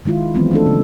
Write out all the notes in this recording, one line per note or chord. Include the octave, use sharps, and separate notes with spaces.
D#3 G#3 E4 F4
D#3 E3 F#3 G#3 B3 C4
A3 D4 A4
C#3